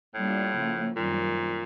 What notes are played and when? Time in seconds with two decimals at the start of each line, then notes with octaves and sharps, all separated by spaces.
0.15 A2 G3 A#3 D4 F4
0.55 C#3 F3 A#3
0.96 F#2 A#2 D#3 G3 C4